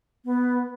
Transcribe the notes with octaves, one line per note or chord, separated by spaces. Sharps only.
B3